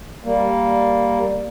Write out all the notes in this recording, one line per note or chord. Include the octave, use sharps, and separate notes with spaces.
G3 A#3